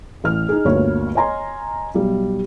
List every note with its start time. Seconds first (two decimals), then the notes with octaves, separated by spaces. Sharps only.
0.24 A1 F6
0.49 D#4 G#4
0.65 G1 D2 G2 A#3 C#5
1.15 C#5 D#5 G#5 A#5 C6
1.94 B1 G3